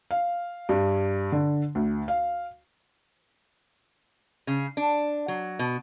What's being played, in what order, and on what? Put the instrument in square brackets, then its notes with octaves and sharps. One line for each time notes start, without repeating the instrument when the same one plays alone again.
[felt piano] F5
G2
D3
D2
F5
[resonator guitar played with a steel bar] C#3
D4
F#3
B2